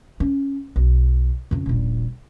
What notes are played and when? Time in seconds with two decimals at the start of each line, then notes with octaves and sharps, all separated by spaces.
0.20 C#4
0.76 B1
1.51 F2 C#3
1.66 D#1 A#1